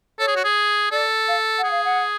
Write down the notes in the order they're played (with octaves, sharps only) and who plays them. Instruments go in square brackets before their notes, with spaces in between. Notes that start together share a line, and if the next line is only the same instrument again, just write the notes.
[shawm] A4 [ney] C#5
[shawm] G#4
F#4
G#4
[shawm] A4 [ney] D5
[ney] F5
F#5
[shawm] G#4
[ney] F5
F#5